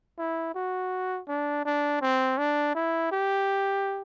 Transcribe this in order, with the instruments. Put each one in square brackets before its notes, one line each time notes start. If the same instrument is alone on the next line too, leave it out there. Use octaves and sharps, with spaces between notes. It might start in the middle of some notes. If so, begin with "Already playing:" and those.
[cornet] E4
F#4
D4
D4
C4
D4
E4
G4